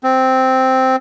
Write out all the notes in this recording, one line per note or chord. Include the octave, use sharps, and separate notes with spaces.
C4